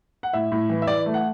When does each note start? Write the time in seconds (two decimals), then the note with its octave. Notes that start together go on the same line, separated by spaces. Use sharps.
0.23 F#5
0.33 A2 E5
0.52 A2
0.70 E3
0.82 E5
0.87 E3 D5
1.06 A3
1.14 F#5